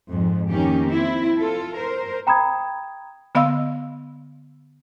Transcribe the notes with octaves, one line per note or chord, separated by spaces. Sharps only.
F2 G#2
D#3 A#3 C#4 D#4 G4
C4 E4
F4 A4
A#4 C5
G5 A#5 B5 D#6 G#6
D3 B3 D#5 F5 C6 E6